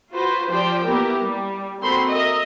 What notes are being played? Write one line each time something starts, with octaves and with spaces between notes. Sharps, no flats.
F4 F#4 B4 C5
F3 F4 G4 C5 D5 G5
A#3 B3 E4 G4 A#4
G3
A#3 C4 F#4 A4 B5 C6
A#4 D#5 E5